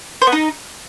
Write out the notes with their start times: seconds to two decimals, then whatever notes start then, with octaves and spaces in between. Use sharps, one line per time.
0.22 C5
0.27 B3
0.32 D#4